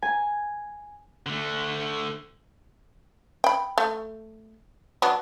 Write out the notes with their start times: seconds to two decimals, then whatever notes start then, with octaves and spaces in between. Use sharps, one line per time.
0.02 G#5
1.26 D3 A3
3.44 G5 B5
3.78 A3
5.02 F#3 B3 D4